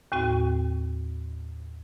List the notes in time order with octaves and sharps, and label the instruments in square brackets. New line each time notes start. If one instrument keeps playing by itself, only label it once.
[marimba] D#2 A2 C4 F#4 G5